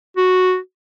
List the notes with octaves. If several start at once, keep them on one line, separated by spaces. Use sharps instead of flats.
F#4